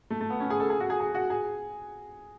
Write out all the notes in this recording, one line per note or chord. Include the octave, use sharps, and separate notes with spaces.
A3
A3
B3
C#4
G#4
A4
G#4
F#4
G#4
G#4
F#4
G#4